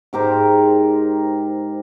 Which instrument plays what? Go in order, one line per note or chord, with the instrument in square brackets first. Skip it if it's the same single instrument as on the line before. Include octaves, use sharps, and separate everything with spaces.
[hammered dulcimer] G#2 G4 A#4 C5